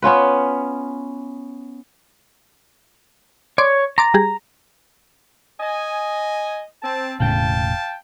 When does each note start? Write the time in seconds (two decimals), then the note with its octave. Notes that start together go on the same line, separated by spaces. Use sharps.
0.02 B3 C#4 F4 B4
3.58 C#5 D5 C6 D6
3.98 A#5 C6 D6 A6
4.14 G3 G4 G#4
5.60 D#5 G#5
6.82 C4 A5
7.20 E1 A2 C#3 F5 G5 A5